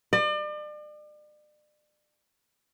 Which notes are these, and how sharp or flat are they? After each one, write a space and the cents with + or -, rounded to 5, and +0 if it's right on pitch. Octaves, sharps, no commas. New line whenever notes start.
D5 +40